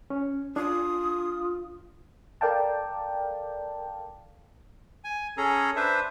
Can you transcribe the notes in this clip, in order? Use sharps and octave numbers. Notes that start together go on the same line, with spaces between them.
C#4
D4 F4 D#6
A4 A#4 D5 F5 G5 A5
G#5
C#4 G#4 A4 A#5
D4 B4 C5 E5